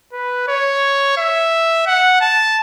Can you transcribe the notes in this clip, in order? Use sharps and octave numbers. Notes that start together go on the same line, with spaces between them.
B4
C#5
E5
F#5
A5